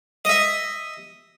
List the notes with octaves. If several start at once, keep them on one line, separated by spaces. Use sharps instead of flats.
D#5 E5